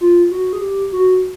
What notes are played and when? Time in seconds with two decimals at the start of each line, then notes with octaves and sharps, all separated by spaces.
0.01 F4
0.31 F#4
0.53 G#4
0.62 G4
0.92 F#4